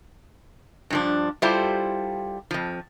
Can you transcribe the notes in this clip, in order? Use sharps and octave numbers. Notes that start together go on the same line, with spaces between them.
G2 F3 D4
G3 E4 F4 G4 A4 C5
F2 F3